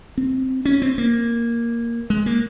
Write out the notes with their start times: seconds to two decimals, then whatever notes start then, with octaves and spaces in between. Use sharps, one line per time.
0.18 C4
0.65 C#4
0.82 C4
0.98 A#3
2.10 G#3
2.26 A#3